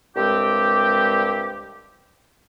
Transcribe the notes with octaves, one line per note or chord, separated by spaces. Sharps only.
C2 G2 G#3 C4 G4